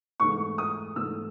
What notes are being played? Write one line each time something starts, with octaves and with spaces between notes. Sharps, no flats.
G#2 E3 A3 C#6
D#6
G#2 E3 A3 E6